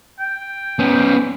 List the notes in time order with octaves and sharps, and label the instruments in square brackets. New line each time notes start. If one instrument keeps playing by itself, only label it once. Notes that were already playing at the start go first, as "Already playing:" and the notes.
[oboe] G5
[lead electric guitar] B3 C#4